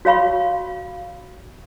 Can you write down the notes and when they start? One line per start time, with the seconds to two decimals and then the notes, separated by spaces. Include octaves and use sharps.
0.05 F#4 C#5 F5 B5 C#6